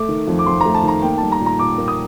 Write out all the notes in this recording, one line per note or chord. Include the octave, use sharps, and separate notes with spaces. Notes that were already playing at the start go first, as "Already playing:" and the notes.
Already playing: A3 D6
D#3
F2
D6
F2 C6
A3 A#5
A5
D#3 A#5
A#3 G5
G3 A5
A#5
A#2
A#5
A#2 D6
A#3
D#6